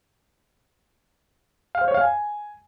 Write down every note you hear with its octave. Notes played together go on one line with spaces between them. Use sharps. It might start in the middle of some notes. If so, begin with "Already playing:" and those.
F5
C5
C#5
F5
G#5